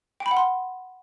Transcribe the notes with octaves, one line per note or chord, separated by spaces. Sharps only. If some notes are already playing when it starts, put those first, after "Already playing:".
G5
B5
F#5
C6